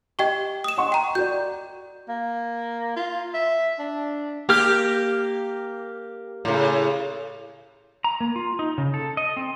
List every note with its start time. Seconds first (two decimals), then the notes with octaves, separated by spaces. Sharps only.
0.19 G4 D#5 G5 C#6
0.64 D#6 E7
0.78 D#5 F#5 C#6
0.92 G5 A#5
1.15 F#4 D5 G6
2.09 A#3
2.96 F4
3.34 E5
3.79 D4
4.49 A#3 G4 F6
6.45 A2 C#3
8.04 A#5
8.21 A#3
8.36 F4
8.59 D#4
8.78 C#3
8.94 A4
9.17 D#5
9.37 C4